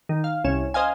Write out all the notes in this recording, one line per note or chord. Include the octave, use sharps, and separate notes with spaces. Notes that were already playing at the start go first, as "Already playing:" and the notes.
D#3
F5
C2 C#4 E7
C5 D#5 F5 G#5